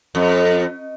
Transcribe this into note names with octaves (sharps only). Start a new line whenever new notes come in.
F2